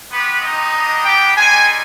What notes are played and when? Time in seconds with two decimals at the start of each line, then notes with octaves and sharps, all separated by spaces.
0.10 B3 C4 G4 B4
0.42 D#4 D#5
0.73 G3 B3 D4
1.05 G4 G5
1.36 G3 C4 D#4 G#4 G#5